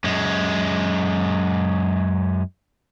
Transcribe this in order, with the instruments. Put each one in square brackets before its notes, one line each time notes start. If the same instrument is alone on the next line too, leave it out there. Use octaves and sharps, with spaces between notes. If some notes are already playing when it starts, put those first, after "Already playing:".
[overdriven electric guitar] F#2 G#3